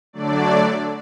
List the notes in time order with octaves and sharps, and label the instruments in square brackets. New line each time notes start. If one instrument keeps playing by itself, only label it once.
[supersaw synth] D3 F#3 A3 D4 D5